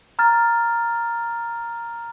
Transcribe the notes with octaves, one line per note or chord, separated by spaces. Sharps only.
A#5 F6 A6